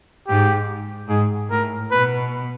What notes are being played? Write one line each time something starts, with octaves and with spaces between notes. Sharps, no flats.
G#2 G4
G#2 G#4
A2 A#4
B2 B4